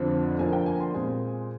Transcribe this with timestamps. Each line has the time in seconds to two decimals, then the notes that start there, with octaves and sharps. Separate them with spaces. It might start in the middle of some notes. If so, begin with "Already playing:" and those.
Already playing: F2 D3 F3 C4
0.39 D3 F3 A#3 G#5
0.53 G5
0.66 G#5
0.80 C6
0.94 A#2 G#3 C4 G#5